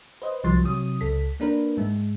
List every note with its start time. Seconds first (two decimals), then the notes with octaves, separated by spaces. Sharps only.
0.22 B4 C5 D#5
0.44 C2 F3 F#3 C6 A6
0.64 C3 F#3 D#6
1.01 C#2 A4 B6
1.40 A#3 D4 A#4 B4
1.77 G#2 G#3